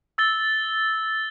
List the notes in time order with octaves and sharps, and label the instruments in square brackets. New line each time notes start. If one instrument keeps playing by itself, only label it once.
[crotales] E6 A6 G7